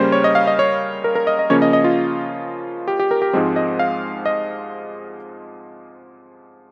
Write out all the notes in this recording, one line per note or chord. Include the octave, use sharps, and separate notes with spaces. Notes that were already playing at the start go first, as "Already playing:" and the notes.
Already playing: C#3 G3 A#3 C#4 C5
C#5
D#5
F5
D#5
C#5
A#4
A#4
D#5
D#5
C#3 F3 A#3 C#4 C#5
D#5
D#5
F4
G4
G4
A#4
G4
G#2 F3 G#3 C4
D#5
F5
D#5